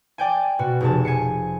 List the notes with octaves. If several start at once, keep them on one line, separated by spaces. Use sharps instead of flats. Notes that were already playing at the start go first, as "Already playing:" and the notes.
D5 G5 G#5
B2 F#4
F1 G#4 A5
G#5 C7 C#7